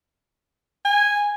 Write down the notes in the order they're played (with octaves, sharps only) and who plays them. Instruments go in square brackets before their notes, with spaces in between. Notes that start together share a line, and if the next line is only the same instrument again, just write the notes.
[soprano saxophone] G#5